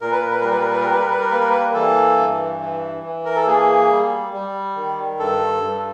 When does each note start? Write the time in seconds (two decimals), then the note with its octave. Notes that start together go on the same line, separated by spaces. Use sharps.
0.01 A#2 A#4
0.11 B4
0.21 A#4
0.30 B4
0.41 G3 A#4
0.51 B4
0.61 A#4
0.70 B4
0.81 A#4
0.88 G3 B4
1.00 A#4
1.10 B4
1.20 A#4
1.29 A#3 B4
1.40 A#4
1.50 B4
1.60 A#4
1.74 E3 A4
2.17 G2
2.60 E3
3.03 E3
3.25 A#4
3.36 A4
3.47 A#3 G#4
3.90 G3
4.33 G3
4.76 D#3
5.19 G2 A4
5.63 G2